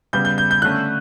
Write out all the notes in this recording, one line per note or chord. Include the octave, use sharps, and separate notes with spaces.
C#3 G3 B3 G6
G6
G6
G6
D3 A3 C#4 F#6